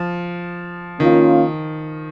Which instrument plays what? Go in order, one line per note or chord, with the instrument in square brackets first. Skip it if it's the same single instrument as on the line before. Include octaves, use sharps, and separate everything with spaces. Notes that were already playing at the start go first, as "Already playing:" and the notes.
Already playing: [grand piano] F3
[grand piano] D#3 [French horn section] A#3 C#4 F4